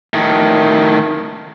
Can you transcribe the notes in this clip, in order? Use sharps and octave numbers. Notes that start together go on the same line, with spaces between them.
A2 D#3